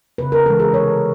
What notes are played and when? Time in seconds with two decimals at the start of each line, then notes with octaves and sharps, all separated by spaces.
0.18 C#3 B4
0.32 A#4
0.46 E3 G#3 A4
0.60 G#4
0.73 C3 C#5